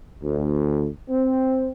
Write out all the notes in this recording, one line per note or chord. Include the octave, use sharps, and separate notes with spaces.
D2
C4